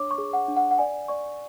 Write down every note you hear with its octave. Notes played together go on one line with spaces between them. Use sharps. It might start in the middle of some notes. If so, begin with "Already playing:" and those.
Already playing: D4 C#5 D6
C#6
G#4
F#5
D4
F#5
F#5
D5 G#5
D5 C#6